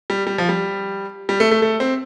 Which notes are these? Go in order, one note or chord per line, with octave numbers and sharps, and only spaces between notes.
G3
G3
F3
G3
G3
A3
A3
A3
C4